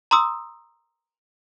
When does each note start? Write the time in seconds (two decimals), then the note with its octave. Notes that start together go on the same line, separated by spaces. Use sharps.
0.11 A#5 C6 D#6 E6